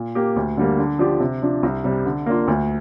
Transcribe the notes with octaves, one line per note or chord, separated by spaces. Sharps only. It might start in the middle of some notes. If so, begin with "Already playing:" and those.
Already playing: A#2
A#3 G4
D2
D3 G3 A#3
D3
F3 D4 G4
C3
F3 D4
C2
C3 G3
D3
A#3 D4 F4
D2